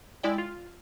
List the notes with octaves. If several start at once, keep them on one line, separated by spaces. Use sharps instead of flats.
G#3 E4 D5 G5
F4